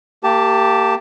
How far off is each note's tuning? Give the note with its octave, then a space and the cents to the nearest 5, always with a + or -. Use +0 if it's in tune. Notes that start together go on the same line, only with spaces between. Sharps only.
A#3 -30 G4 +0 A5 +0